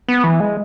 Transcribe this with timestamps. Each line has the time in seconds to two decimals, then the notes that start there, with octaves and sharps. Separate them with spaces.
0.08 B3
0.24 E3
0.40 G#3